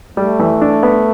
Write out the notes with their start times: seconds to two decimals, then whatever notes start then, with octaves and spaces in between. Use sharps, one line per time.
0.17 G3 A3
0.39 E3
0.61 D4
0.83 B3